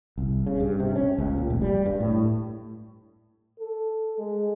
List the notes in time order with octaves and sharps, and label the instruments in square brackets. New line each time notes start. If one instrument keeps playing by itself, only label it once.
[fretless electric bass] C2
C#3
G2
C3
C#4
C#2
A#2
F1
G3
G2
A2
[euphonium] A4
G#3